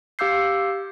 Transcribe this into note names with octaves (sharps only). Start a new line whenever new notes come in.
G4 F5 D6 E6 G6 C7